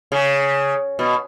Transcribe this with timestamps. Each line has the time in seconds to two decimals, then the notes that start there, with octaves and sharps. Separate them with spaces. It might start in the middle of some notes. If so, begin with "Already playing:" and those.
0.12 C#3
0.99 B2